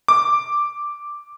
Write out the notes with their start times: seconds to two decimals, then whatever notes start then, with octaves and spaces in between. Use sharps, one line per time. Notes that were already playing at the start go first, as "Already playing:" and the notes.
0.08 D6